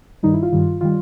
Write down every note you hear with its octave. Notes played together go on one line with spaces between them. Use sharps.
G2 D#3 G3 D#4
E4
F4
G2 D#3 G3
D#3 G3 F4